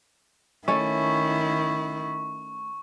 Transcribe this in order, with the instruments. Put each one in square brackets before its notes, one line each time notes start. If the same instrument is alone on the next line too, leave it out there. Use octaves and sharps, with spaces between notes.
[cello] D#3 E4 [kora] A3 C#4 [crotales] C#6